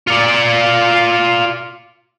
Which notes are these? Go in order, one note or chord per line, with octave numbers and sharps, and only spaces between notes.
F4 D5